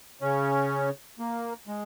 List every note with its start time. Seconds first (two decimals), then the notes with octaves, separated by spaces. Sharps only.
0.21 C#3 C#4
1.19 A#3
1.68 G#3